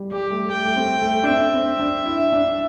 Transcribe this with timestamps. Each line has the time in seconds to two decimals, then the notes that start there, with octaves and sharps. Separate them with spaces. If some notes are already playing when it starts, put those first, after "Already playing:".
Already playing: G3
0.11 G3 G4
0.31 A3
0.50 A3 G5
0.65 A3
0.76 C4
1.02 A3
1.23 D4
1.28 C4 E5
1.54 C4
1.80 D4
2.06 E4
2.33 D4